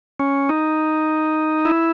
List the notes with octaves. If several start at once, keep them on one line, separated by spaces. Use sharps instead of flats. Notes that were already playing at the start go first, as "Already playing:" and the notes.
C#4
D#4
E4